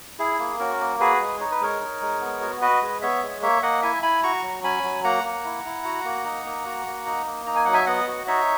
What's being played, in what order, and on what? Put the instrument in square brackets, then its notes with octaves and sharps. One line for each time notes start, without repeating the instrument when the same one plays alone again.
[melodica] E4 G#4
A#3
C#4 F#4 A#4
A#3
F#4 G#4 B4
G#3
D#4 C#5
B4
G#3 A#4 C#5
D#4
G#3
B3
F#4
F#4 B4 D#5
G#3
B3 C#5 E5
G#3
A#3 C#5 E5
A#3 D#5 F#5
E4 E5 G#5
E4 G#5 B5
F#4 A#5 C#6
F#3
C#4 G#5 B5
F#3
A#3 F#5 A#5
A#3
E4
E4
F#4
A#3
D#4
A#3
F#4
A#3
D#4
A#3
D#4 A#5
G#5
F#3 F#5
E5 G#5
B3 D#5 F#5
F#4
D#4 C#5 E5